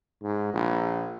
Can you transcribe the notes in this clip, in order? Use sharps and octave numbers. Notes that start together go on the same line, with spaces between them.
G#2
A#1